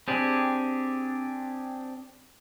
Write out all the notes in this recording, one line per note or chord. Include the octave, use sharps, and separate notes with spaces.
C4 D4 G4 G#4